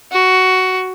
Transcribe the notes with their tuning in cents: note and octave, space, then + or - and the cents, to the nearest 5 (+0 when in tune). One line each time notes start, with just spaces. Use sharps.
F#4 +10